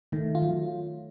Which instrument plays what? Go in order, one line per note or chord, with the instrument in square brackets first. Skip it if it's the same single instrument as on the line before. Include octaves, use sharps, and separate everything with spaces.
[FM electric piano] D#3 [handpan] A3
[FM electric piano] F4
[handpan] F#3